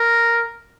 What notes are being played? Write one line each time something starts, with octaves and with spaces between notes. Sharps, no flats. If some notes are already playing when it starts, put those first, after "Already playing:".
Already playing: A#4